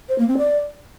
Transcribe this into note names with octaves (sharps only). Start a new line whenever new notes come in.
C5
A#3
C4
D5